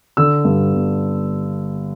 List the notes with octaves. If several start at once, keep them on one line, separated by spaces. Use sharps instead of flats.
D3 E6
G2
G1